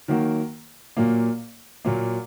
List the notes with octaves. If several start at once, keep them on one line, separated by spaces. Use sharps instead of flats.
D#3 F#3 A#3 F#4
A#2 F#3 A#3
A#2 F#3 A#3